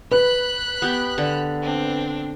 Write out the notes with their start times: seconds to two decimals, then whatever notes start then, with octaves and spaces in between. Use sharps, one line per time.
0.12 B4 B5 F#6
0.82 B3 G4
1.18 D3
1.62 C4 D4